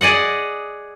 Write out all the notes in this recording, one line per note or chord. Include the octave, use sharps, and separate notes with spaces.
G#4 D5 D#5 F#5